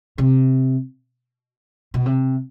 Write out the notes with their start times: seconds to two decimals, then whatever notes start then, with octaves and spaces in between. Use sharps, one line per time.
0.18 C3
1.94 B2
2.06 C3